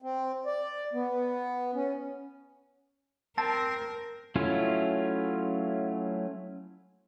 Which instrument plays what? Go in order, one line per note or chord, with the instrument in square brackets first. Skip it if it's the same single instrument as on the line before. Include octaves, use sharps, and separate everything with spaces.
[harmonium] C4
D5
B3
C#4
[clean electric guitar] C4 [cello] A#4 [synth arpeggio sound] A5
[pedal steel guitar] F#3 A3 C#4 E4 F4